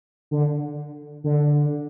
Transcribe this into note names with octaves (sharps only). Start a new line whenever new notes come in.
D3
D3